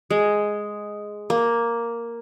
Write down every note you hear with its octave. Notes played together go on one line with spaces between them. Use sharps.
G#3
A#3